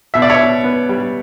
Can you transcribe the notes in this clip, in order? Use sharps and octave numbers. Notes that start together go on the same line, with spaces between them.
B2 E5
D5
C#5 E5
B2
B3
G3